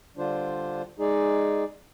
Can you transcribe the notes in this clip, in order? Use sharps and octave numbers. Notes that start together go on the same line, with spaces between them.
D3 G3 D4 F4 C5
G#3 D#4 G#4 D5